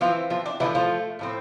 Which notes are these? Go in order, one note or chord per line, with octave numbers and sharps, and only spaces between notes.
E3 F3 C4 F4
F3 F4
D4
D3 E3 F3 A3 E4
F3 F4
A2 F3 C4